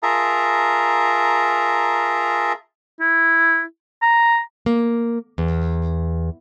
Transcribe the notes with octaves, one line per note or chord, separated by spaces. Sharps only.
F4 G#4 A#4 E5 A5 A#5
E4
A#5
A#3
E2